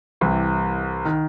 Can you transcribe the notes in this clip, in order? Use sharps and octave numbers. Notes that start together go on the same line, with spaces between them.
C2 C3 E3
D#3